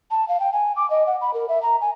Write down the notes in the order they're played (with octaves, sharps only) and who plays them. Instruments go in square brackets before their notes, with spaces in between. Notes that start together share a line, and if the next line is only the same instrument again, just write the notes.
[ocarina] A5
F5
G5
G#5
D6
D#5
F#5
B5
A#4
E5
A#5
G#5